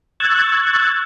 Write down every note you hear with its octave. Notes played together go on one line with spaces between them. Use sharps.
C#6 E6 F#6 G#6 A6